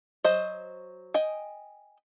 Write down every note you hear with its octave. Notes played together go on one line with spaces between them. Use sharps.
F#3 C5 D#5
D#5 G5 G#5